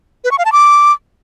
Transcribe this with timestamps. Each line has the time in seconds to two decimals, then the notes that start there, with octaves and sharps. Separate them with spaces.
0.24 B4
0.31 C#6
0.38 F5
0.45 A5
0.52 D6